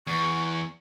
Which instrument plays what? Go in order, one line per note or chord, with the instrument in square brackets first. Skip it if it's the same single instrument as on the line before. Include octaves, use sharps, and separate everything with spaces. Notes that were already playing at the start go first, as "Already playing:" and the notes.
[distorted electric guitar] E2 [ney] C#6